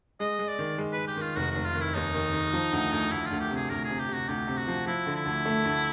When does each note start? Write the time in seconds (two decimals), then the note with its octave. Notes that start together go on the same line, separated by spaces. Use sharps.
0.20 G#3 D#5
0.39 G#3
0.48 D5
0.59 D#3
0.78 G#3
0.92 B4
0.98 G#3
1.08 G4
1.17 D#3 F4
1.36 F1 F#4
1.51 F1 F#4
1.65 F4
1.75 D#3
1.81 E4
1.94 D#2 D#4
2.14 D#3
2.34 D#3
2.53 F3
2.72 D2
2.92 D2
3.12 D2 E4
3.26 F4
3.31 D2
3.40 G4
3.50 C3
3.56 G#4
3.70 D2 A#4
3.85 C3 G#4
3.99 G4
4.09 C3 F#4
4.28 D2 G4
4.48 C3
4.57 F#4
4.68 F3
4.86 F3 E4
5.06 D3
5.15 E4
5.25 D2
5.45 A3
5.65 D2